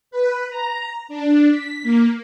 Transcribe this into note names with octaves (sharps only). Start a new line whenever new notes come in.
B4
A#5
D4
B6
A#3